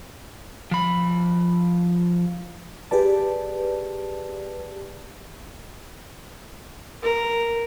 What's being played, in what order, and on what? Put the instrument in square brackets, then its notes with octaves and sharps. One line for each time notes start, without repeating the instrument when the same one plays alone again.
[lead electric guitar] F3 B5
[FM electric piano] G4 G#4 B4 D5 A5
[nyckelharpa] A#4